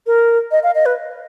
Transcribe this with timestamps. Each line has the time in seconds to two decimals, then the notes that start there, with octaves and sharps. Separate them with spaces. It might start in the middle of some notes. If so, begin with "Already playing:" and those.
0.07 A#4
0.52 D#5
0.63 F5
0.75 D#5
0.86 B4